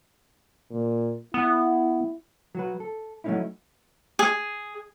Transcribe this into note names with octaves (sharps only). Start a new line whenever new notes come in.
A#2
B3 E4
F#3 F#4 B4
A4
F#3 A3 A#3 C#4 D#4 E4
G#4